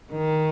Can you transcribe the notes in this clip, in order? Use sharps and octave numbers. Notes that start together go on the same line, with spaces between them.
D#3